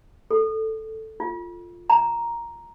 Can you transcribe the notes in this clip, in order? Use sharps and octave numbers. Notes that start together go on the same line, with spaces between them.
A4
F4
A#5